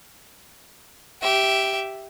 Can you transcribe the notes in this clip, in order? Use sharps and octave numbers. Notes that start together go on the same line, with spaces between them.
G4 E5